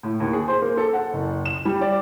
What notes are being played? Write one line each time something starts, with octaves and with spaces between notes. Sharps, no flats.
A2
D#2
G#4
C5
A#3
A4
F#5
F#1
E7
G3
D5